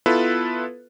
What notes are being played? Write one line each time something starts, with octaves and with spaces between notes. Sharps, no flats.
B3 E4 F4 A4 B4